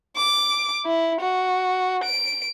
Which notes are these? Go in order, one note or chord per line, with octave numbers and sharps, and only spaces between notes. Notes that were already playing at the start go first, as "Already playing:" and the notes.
D6
E4
F#4
D7